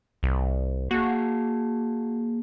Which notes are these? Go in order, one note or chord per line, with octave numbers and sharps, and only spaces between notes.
C2
A#3 F#4 G#4